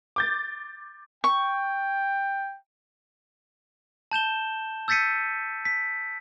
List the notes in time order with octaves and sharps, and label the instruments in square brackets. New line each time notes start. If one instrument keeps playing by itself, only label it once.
[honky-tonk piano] D6 G6 A6
[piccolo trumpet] G5 [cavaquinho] C#6
[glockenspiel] A5 G6 E7 G7
E6 G6 A6 B6 C#7 D#7
B6